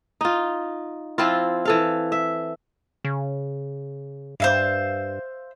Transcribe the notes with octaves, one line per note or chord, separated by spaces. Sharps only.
D#4 F4
F3 C4 E4 F4
E3 A4 F5
E5
C#3
G2 C5 E5 F5